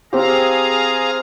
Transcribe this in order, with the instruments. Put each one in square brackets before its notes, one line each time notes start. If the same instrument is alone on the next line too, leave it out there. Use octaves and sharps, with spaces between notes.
[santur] C4 G4 [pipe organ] G#4 F5 A#5